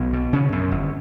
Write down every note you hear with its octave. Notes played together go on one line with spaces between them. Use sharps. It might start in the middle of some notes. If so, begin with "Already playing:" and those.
Already playing: B1 B3
B2
C#3 C#4
F#2
G1